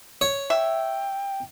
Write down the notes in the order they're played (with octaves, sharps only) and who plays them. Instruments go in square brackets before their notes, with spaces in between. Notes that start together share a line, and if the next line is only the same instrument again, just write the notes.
[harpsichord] C#5
[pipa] E5 [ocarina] G5